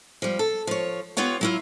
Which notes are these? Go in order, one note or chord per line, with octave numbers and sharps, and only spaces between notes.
F3 G3
A4
F3 C#5
B3 F4 G4 C#5 F#5
F#3 E4 F4